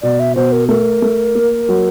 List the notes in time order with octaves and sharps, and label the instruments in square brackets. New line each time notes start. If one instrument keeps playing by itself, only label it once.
[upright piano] B2 [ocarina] D5
[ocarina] E5
[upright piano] B2 [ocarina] C5
[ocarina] A#4
[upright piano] A3 [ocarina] A#4
[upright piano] A3
A#3
F#3